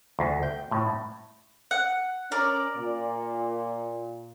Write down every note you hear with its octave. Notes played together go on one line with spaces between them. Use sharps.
D2
G5
A2
F#5
C#4 A#4 D5
A#2